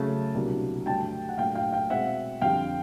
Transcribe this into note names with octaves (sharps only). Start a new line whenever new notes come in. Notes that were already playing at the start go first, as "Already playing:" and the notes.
Already playing: C#3 F#3 A3 A5
C2 B2 F#3 A#3 D4
G2 D3 F#3 A3 D4 G5 A5
F#5
A#2 F#3 A3 D4 F5 G5
F5 G5
F5 G5
B2 G#3 C4 E5 F#5
F2 D3 G3 F5 G5